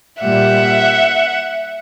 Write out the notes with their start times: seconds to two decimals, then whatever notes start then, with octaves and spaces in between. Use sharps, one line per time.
0.22 A#2 G3 E5 F#5